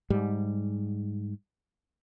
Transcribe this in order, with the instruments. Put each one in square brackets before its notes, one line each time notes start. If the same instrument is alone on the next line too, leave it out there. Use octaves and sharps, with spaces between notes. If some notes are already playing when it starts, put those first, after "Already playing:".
[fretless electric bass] G#2 G3